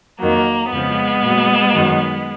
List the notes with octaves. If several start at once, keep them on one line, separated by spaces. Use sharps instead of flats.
F2 D#3 F#3 A#3
F2 C#3 F3 G#3 B3
A#2 F#3
F#2 D#3 F#3